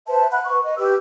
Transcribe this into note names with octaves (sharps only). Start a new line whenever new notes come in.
B4 C5 E5 A5
F#5 B5 F#6
B4 C#6
D#5
G4 B4 E6